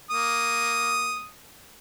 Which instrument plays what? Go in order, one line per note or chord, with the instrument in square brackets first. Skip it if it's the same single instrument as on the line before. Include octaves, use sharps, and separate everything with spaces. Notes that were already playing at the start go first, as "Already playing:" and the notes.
[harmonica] A#3 D#6